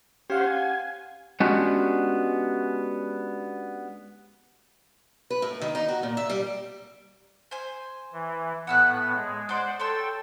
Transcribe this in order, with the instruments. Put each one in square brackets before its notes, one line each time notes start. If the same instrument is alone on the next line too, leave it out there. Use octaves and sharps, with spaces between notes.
[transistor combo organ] C#4 C5 [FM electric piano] G4 F5 F#5
[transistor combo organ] G#5
[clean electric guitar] G#3 B3 C#4 D4 F#4 G4
[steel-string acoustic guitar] B4
A2
D#3
D#4
F#4
A#2
E5
G3
[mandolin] C5 G#5
[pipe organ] E3
[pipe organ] A2 B3 [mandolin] F#5 E6 F#6
[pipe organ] G#3
[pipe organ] C5 F#5 [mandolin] D5 C6 D6
[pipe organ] A4 G5 [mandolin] C#5 C6 E6